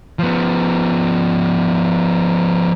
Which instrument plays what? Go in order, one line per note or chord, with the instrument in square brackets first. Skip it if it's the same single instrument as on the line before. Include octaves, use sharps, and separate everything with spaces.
[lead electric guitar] F3 B3